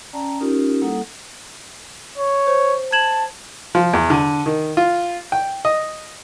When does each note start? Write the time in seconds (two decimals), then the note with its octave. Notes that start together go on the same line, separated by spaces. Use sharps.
0.13 C#4 D5 G5 A5 A#5
0.41 C#4 D#4 F4 G4 A#4
0.82 G3 A#3 E4 A4 F#5 D#6
2.18 C#5
2.47 C5
2.92 A5 G#6 E7 F#7
3.75 F3
3.93 E2
4.10 D3
4.46 D#3
4.77 F4
5.32 G5
5.65 D#5